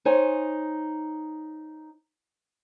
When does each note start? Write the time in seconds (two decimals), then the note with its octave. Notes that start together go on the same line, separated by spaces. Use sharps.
0.05 D#4 C5 C#5 G#5